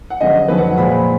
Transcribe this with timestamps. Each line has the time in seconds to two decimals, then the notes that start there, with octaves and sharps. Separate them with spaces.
0.10 F#5
0.21 F#2 D3 F3 G#3 D#5
0.48 F2 D#3 F#3 B4
0.58 F#5
0.77 A#2 F3 G#3 B5